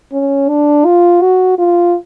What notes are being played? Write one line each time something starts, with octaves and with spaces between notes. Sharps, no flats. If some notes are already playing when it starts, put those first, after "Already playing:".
C#4
D4
F4
F#4
F4